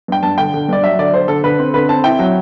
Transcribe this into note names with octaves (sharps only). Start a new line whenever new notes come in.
G2 G5
G2 A5
D3 G5
D3
G2 D5
F#3 E5
D3 D5
D3 C5
D3 A4
D3 B4
C4
D3 B4
C4 A5
E4 G5
F#3